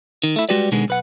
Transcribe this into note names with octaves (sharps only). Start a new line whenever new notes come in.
D#3
A3 E4
G3 G#3 F#4 G4 B4 D5
B2 D3 D#3 G#3 B3
B1 B4 F#5